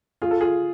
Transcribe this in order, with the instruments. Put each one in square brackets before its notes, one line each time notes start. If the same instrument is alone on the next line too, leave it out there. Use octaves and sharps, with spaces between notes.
[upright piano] F4 [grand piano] G#4
[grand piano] A4
[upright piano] F4 [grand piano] G#4